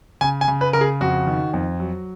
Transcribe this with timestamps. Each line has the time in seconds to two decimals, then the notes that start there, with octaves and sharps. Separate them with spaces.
0.21 C#3 G#5
0.41 G#5
0.48 C#3
0.61 B4
0.73 C#3 A#4
0.81 G#4
1.01 F2 F#4
1.27 D#3
1.54 F2
1.80 F#3